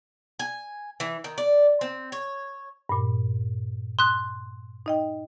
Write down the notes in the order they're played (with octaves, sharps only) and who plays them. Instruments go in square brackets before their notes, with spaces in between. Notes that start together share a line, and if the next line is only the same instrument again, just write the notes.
[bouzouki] G#5
E3
D#3
D5
C4
C#5
[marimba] G2 A#2
[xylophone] C6 F#6 [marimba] D#6
[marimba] D#4 D#5 G5